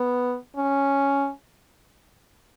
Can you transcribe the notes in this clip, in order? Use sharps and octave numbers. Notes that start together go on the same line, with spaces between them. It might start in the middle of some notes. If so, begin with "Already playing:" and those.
Already playing: B3
C#4